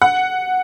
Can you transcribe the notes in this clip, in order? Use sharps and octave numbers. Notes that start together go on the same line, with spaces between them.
F#5